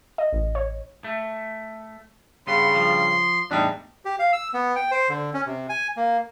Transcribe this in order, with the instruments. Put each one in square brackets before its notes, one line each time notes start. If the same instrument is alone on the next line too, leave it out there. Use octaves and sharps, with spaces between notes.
[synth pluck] D#5
A1
C#5
[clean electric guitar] A3
[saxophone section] G2 C#3 [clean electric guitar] B3 [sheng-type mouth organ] C6
[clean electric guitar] F3
[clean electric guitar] E2 A2 [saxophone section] G3 D4 D#4
[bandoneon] G4
F5
E6
B3
G5
C5
D3
C#4
C3
G#5
A#3